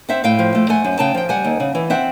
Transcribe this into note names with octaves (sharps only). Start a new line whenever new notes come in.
C4 E5 F#5
A2 F5 G5
F3
A3
A3 F#5 G#5
F#2
C#3 G5 A5
F3 G5
G3 F#5 G#5
D#2
C#3
E3
C4 E5 F#5